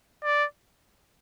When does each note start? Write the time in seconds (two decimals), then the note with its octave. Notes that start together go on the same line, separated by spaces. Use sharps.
0.24 D5